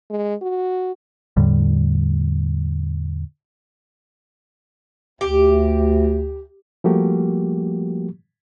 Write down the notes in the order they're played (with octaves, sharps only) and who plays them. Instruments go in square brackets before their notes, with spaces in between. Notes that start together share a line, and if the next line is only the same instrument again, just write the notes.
[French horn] G#3
F#4
[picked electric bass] E2 A2 D3 G3
[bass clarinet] D2 [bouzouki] G4
[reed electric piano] F3 G3 A3 A#3 F#4 G4